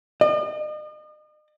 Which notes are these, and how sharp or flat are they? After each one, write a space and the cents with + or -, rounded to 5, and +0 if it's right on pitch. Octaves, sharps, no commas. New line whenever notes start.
D#5 -40